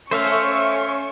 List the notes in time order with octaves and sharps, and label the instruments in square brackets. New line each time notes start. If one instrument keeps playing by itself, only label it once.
[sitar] A3 [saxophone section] C#4 [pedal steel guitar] C5 E5 F5 [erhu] C#6